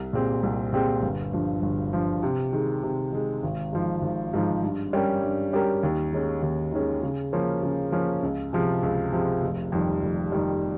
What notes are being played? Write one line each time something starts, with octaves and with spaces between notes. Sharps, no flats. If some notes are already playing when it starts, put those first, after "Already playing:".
Already playing: C2
A#2 G#3 C4 G4
C2
A#2 G#3 C4 G4
G1
G2 F3
G1
G2 F3
C3
D#3 G#3
C3
D#3 G#3
G#1
G#2 F3
G#1
G#2 F3
G2
G3 C#4 G4 A#4
G2
G3 C#4 G4 A#4
D#2
D#3 G#3 C#4
D#2
D#3 G#3 C#4
C#3
F3 A#3 C#4
C#3
F3 A#3 C#4
C#2
C3 F3 G#3
C#2
C3 F3 G#3
F1
F2 D#3 G3
F1
F2 D#3 G3